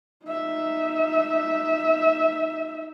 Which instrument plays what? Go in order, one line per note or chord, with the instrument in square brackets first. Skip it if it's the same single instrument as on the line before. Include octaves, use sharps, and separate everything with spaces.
[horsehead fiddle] D#4 E5